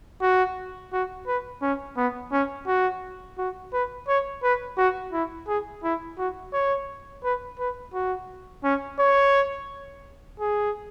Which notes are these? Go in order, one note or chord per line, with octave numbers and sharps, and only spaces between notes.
F#4
F#4
B4
C#4
B3
C#4
F#4
F#4
B4
C#5
B4
F#4
E4
G#4
E4
F#4
C#5
B4
B4
F#4
C#4
C#5
G#4